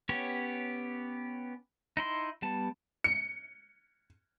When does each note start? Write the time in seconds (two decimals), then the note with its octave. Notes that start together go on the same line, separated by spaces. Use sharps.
0.09 B3 C#4 G4 C#5
1.97 D#4 E4 C6
2.42 G3 B3 A5
3.04 C#7